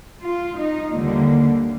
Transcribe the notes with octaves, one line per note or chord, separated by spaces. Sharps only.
F4
D#4
D#2 D3 G3 A#3